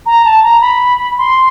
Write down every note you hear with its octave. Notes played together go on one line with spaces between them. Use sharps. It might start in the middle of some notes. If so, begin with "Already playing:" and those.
A#5
A5
A#5
B5
C6